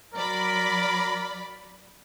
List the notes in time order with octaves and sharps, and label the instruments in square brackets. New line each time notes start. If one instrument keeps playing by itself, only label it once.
[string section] F#3 D5 B5 [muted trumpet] A#4